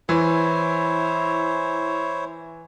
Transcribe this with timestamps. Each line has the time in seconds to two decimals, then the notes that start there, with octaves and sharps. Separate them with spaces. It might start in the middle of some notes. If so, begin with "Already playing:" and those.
0.09 E3 E4 C5 C#5